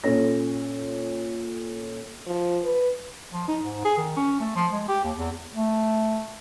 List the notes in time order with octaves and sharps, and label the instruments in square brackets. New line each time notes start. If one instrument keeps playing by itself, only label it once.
[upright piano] A#2 C#4 A4 C#5 A#6
[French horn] F3
B4
[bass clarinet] F3
D#4
G#2
G#4
D#3
C#4
A3
F3
G#3
G4
D#2
E2
A3